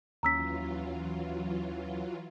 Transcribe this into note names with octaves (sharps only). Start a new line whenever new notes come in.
D#2 E3 F#3 C#4 F4 A#5 E6 B6